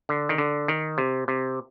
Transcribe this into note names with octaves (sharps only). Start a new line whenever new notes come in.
D3
D#3
D3
D#3
C3
C3